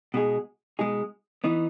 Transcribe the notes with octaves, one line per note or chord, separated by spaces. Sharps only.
B2 G#3 D#4 G#4
B2 G#3 D#4 G#4
E3 B3 D#4